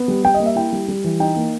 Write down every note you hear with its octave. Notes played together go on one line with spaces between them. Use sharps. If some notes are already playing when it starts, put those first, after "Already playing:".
Already playing: B3
G3
G3 G5
D#5
A#3
E5
E4 G5
G3
G3
E3
D#4 G5
A#3